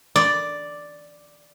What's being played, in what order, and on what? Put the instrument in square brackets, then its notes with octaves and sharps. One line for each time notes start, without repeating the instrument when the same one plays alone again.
[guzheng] D5